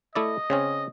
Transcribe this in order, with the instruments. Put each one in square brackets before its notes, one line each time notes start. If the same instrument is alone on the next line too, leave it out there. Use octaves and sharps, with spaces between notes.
[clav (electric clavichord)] A3 E4 D5 [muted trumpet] D#5
[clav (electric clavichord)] C#3 C4 C#4